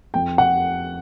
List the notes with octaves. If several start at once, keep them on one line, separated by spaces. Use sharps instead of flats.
F2 G5
F#5